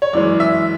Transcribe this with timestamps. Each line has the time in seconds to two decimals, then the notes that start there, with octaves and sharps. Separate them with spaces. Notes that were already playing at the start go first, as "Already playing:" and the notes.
0.02 C#5
0.13 F#2 E3 G#3 D5
0.40 E5